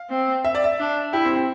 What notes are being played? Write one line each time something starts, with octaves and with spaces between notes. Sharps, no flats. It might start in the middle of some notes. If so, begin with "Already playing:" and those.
Already playing: F5
C4
E5
D5
E5
D4
E4 G4
C4
C4